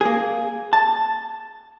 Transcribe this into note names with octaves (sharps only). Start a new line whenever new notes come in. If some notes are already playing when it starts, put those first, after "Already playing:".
A#3 G#4
A5